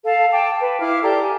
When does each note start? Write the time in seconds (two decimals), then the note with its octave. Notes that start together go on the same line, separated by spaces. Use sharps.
0.04 A4 F5 A5
0.32 G5 A5 D6
0.60 B4
0.80 E4 F5 D6 F6
1.03 G4 A4 D5 A#5
1.21 G#5